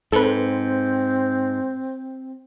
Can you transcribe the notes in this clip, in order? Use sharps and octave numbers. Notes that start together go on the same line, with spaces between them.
G#2 C4 A4 B4